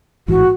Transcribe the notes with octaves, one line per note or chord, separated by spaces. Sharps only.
A1 G#2 E3 F#4